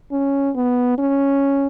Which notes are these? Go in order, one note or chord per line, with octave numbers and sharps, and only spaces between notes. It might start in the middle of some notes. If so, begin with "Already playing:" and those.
C#4
B3
C#4